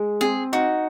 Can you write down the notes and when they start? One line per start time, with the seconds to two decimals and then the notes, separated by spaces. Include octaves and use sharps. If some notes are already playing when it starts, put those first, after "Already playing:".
Already playing: G#3
0.21 C4 G#4
0.53 D#4 F#4